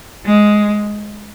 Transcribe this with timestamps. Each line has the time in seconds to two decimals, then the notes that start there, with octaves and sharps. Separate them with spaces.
0.25 G#3